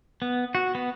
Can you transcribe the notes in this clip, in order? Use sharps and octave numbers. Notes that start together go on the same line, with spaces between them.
B3
F#4
B3